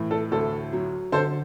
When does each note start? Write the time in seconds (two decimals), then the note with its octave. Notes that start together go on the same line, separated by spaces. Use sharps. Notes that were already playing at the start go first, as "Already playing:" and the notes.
Already playing: A2 E3
0.11 A4
0.32 D2 A4
0.73 F#3
1.12 D3 A4 C5